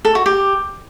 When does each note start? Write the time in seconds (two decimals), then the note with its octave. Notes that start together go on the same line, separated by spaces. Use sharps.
0.05 A4
0.15 F#4
0.26 G4